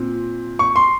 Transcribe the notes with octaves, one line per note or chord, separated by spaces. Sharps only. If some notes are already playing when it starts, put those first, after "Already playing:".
Already playing: A#2 C4
C#6
C6